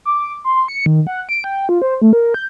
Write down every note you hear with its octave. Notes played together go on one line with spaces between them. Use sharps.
D6
C6
C#7
D#3
F#5
D7
G5
F4
C5
A3
A#4
G6